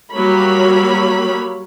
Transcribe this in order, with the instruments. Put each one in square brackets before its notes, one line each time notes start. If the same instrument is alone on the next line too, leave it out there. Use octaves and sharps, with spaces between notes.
[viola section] F#3 G3 A#3 A#4 C#5 B5